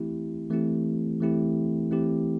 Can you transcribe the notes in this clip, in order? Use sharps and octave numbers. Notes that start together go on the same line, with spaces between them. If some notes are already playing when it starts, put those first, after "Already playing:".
Already playing: E3 A3 C4 E4 G4
E3 A3 C4 E4 G4
E3 A3 C4 E4 G4
E3 A3 C4 E4 G4